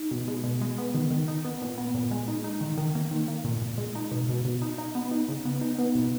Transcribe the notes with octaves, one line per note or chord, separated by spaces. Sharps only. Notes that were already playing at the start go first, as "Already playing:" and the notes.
Already playing: D#4
B2
G#3
B2
G#3
B3
D#3
D#3
D#4
B3
A#2
B3
A#2
G#3
D#4
D#4
D#3
D#3
A#3
D#3
A#3
A#2
A#2
G#3
D#4
B2
B2
B2
D#4
D#4
B3
D#4
C#3
B3
D#4
B3
B2